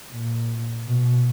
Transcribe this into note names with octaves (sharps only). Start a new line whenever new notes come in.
A#2
B2